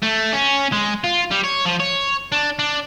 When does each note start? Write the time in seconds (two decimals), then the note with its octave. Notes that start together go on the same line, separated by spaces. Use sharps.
0.02 A3
0.32 C#4
0.72 G#3
1.04 F4
1.31 G3
1.44 C#5
1.65 F3
1.80 C#5
2.32 D4
2.59 D4